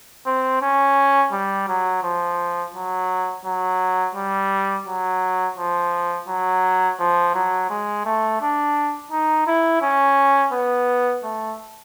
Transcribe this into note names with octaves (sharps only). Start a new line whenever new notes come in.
C4
C#4
G3
F#3
F3
F#3
F#3
G3
F#3
F3
F#3
F3
F#3
G#3
A3
D4
D#4
E4
C#4
B3
A3